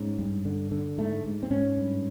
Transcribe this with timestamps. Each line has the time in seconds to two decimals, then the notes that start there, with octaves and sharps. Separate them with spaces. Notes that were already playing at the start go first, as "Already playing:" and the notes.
Already playing: G#2 C#4
0.18 G2
0.45 D3
0.71 D3
0.98 G#2 A3
1.24 G#2
1.43 C4
1.50 G#2 C#4
1.77 G2